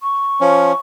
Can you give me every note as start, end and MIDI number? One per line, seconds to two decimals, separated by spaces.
0.03 0.78 85
0.41 0.72 53
0.41 0.72 61